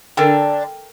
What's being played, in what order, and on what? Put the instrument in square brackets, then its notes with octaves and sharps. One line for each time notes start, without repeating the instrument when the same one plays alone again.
[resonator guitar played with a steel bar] D3 D4 [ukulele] A4 A#4 G5